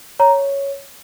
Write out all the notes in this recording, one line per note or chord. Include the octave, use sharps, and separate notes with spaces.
C#5 A#5